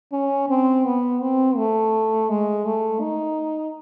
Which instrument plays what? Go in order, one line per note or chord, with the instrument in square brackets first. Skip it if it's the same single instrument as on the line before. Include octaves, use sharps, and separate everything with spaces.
[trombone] C#4
C4
B3
C4
A3
G#3
A3
D#4